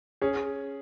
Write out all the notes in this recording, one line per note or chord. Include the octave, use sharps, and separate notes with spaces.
C#4 G#4